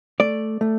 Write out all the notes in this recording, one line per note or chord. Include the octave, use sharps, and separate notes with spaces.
A3 D5
A3